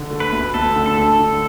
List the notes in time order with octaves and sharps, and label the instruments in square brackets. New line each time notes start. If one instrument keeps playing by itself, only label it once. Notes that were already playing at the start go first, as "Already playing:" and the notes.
Already playing: [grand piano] D3
A3
[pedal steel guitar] B4
[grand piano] D2
[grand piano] D2 [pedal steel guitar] A4
[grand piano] D3
[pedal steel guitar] A4
[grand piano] A3
D3